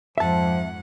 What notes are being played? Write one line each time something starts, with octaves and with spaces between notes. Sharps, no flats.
F2 G#2 F3 E5 F#5 A5